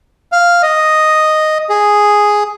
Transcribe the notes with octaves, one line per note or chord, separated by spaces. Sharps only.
F5
D#5
G#4